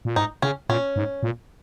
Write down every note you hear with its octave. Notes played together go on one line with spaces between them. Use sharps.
A#2
G#2 D#4
C#3 C#4
A#2 C#4
G#2
A#2